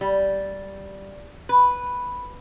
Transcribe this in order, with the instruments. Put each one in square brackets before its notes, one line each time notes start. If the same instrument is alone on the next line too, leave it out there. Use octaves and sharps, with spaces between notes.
[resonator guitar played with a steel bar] G3
B4